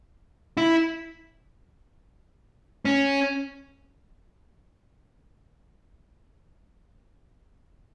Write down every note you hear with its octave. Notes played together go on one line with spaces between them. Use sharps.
E4
C#4